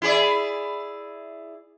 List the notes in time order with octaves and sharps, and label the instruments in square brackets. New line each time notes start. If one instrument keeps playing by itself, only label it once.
[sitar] E4 G#4 D5